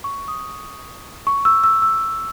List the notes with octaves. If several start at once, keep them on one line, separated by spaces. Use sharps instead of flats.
C#6
D#6
C#6
E6
E6
E6